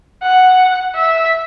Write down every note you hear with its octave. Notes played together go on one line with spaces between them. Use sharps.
F#5
E5